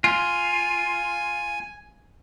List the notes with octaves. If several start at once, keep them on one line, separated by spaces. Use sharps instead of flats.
F4 G#5